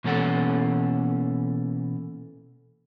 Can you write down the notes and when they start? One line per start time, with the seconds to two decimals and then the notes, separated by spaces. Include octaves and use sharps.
0.04 B2 E3 A#3 C#4 A4 F#5